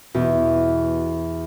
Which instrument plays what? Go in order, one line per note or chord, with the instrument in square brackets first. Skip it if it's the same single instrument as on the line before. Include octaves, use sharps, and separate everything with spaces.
[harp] E2 [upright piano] B2